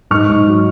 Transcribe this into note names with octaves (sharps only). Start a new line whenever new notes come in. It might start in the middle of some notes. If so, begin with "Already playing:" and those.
G#2 C#6 F6
G#2
F#3